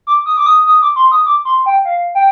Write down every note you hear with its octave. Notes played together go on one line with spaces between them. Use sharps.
D6
D#6
D6
D#6
D#6
D6
C6
D#6
D6
C6
G5
F5
G5